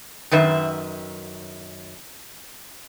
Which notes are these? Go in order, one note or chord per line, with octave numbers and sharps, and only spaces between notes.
F#2 D#3 B4 E5